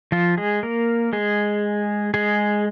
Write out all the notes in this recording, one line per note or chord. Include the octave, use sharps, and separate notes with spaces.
F3 F4
G#3 G#4
A#3 A#4
G#3 G#4
G#3 G#4